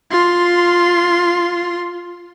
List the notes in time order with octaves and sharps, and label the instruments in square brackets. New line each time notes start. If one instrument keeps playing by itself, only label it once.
[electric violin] F4 C6